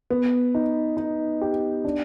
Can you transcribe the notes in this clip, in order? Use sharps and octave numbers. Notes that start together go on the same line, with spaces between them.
B3
D#4
D#4
G4
D4